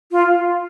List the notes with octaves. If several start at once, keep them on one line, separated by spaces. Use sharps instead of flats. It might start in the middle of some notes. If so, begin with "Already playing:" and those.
F4